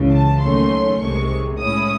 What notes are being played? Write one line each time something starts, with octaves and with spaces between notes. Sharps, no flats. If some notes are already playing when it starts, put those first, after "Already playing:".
Already playing: C#2 C#3 E3
A5
D#2 D#3 F#3 A3 C#4 C6
C2 C3 D#3 G#3 C#6
A2 G#3 C#4 E4 D#6